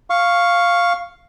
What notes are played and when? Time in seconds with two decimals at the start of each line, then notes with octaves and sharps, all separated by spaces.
0.10 F5 C#6